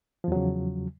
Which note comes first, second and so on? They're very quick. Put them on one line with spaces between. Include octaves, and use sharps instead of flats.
F3 E2 F#3 C#3